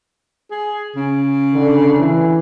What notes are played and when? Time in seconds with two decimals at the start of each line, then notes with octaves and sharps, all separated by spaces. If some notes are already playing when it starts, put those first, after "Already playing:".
0.51 G#4
0.96 C#3
1.53 D3
1.99 E3